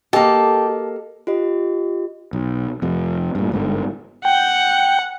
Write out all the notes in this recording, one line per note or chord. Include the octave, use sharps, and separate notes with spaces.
A#3 G4 A4 D#5 A5
F4 G4 D#5
B1
F2 C3
G2 A#2
G1 G#2 B2 D3
F#5 G5